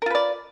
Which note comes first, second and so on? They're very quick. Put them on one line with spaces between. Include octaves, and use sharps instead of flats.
A#4 F4 B4 D5